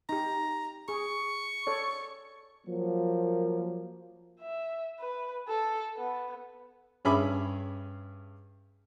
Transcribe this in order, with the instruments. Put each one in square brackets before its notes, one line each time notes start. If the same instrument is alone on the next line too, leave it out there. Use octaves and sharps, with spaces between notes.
[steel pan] D#4 G4 [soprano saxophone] A#5
[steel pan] G#4 [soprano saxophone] C#6
[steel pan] A4 C#5 D5
[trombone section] F3 F#3 A#3
[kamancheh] E5
B4
A4
B3
[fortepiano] G2 C#4 G#4 E5 B5 D6